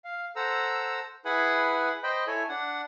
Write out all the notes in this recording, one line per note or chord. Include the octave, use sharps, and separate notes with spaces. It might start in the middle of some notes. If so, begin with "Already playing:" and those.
F5
A4 C5 F#5 A#5 E6
E4 G#4 B4 F#5 G#5 B5
C5 D#5 G5 B5
E4 A4 C#5 G#5
D4 F#5